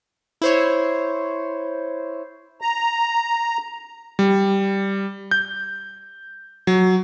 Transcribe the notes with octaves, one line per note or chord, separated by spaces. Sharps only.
E4 C5 C#5
A#5
G3
G6
F#3